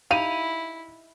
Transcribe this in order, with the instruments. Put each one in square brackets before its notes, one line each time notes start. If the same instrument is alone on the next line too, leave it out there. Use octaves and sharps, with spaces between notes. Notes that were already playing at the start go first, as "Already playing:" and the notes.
[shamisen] D#4 G4 F5 [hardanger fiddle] E4 [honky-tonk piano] D#7 F7